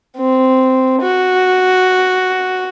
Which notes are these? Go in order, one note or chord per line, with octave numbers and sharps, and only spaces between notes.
C4
F#4